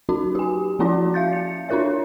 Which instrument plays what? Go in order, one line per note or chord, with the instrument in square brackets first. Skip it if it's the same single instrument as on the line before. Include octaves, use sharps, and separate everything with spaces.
[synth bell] F#3 C#4 D#4 F#4
G4 G#5
F3 A#3 C#4 E4 F#4 D5
E5 F5 G6 A6
C#7
D4 E4 F4 A#4 C#5 E5